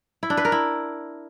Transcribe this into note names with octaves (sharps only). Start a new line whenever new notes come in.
E4
D4
B4
A#4
E4